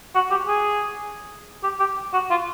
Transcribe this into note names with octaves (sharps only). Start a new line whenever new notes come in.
F#4
G4
G#4
G4
G4
F#4
F4